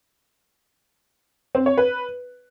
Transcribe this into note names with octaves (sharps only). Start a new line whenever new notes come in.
C4
C#5
B4